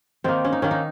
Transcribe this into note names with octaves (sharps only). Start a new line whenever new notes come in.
D#3 A#3 C4 D#4
C#4
D#4
D#3 A#3 C#4
D#4